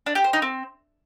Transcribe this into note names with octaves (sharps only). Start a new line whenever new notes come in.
D4
G4
C5
D#4
C4